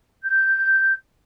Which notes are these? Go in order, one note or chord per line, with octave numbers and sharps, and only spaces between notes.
G6